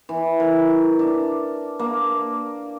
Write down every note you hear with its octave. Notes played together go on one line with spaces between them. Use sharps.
E3
A#4
D4
A#3